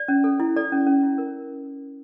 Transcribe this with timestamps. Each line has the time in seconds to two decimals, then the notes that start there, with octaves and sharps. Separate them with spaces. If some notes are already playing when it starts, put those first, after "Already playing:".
Already playing: D5
0.08 C#4
0.24 A4
0.40 E4
0.56 A4 D5
0.72 C#4
0.87 C#4
1.03 E4
1.18 A#4